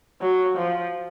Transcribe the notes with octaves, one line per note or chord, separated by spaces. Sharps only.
F#3
F3